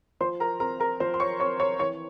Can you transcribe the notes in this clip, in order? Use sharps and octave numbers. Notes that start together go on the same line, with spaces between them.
F3 C5 C6
A#4 A#5
C4 A#4 A#5
A#4 A#5
F3 C5 C6
C6
C#5 C#6
C4 C#5 C#6
C#5 C#6
E3 C#5 C#6